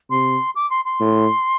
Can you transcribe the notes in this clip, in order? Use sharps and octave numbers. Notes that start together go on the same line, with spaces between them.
C3 C6
D6
C6
C6
A2